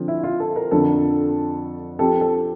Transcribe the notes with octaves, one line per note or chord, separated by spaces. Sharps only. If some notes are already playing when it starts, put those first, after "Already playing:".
Already playing: D3 F3 C4
E4
F4
A4
A#4
F2 D3 F3 A4
F3 C4 G4 A4
A4